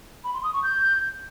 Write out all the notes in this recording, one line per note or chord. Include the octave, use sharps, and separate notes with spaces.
B5
C6
D#6
C#6
G6